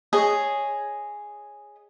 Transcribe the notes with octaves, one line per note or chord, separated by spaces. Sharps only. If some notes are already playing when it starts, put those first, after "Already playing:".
G#4 C#5 D#5